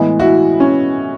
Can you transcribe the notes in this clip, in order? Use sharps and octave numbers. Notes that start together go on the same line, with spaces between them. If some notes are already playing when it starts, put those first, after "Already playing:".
Already playing: A2 E3 G#3 B3
E4 F#4
C#4